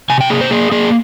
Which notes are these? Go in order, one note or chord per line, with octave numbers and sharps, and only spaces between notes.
C3 G#5
G5
A#3 G#4
C5
A#3 G#4
A#3 G#4